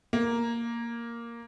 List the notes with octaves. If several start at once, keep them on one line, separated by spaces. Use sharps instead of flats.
A#3